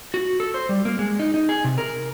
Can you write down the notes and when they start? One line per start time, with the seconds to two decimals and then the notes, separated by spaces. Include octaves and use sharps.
0.14 F#4
0.40 A4
0.54 C5
0.69 G3
0.85 A#3
0.99 G#3
1.19 D#4
1.34 D#4
1.49 G#4
1.64 C3
1.78 A#4